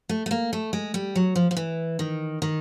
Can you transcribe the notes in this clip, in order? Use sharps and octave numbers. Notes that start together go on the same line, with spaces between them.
A3
A3
A#3
A3
G#3
G3
F#3
F3
F3
E3
D#3
D#3